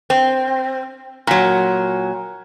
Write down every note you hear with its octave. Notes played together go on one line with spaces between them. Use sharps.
C4
A#2 F#3